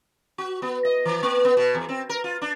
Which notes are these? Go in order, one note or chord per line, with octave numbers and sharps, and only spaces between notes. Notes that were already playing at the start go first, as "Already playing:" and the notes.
F#4
B3
D#5
E3
A#3
B3
B2
E2
C4
A#4
F4
D4